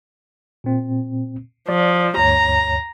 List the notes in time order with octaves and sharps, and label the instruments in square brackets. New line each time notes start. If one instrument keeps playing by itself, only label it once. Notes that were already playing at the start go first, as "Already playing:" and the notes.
[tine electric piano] A#2 C4
[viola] F3 [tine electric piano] D5
[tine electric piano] D2 G2 C#5 [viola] A#5